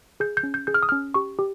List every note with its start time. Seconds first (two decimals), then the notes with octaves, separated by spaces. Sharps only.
0.20 G#4 G6
0.37 G6
0.43 C#4
0.54 G6
0.67 G#4 G6
0.74 F6
0.83 D#6
0.89 C#4 F6
1.14 G4 C#6
1.39 G4